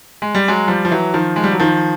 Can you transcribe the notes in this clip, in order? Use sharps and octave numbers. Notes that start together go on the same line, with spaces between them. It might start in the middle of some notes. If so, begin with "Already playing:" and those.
G#3
G3
F#3 G#3
F3 G3
F3
E3 F#3
D#3 F3
G#3
G3
F#3
D#3 F3